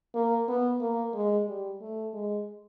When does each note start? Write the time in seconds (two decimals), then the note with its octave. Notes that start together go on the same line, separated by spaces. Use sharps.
0.15 A#3
0.48 B3
0.81 A#3
1.14 G#3
1.47 G3
1.81 A3
2.14 G#3